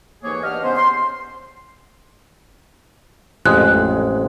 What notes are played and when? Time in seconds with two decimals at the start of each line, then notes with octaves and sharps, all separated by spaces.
0.24 D#2 G#2 E3 A#3 G#4 C#5
0.43 B3 D4 G4 D#5 F5 F6
0.63 G#2 C#3 B3 C#4 C5
0.77 C6
3.46 A1 F2 G#3 F#6